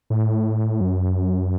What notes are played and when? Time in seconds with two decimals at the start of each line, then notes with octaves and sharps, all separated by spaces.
0.10 A2
0.80 F#2